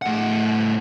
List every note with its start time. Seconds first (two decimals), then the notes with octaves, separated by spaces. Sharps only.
0.02 A2 F#5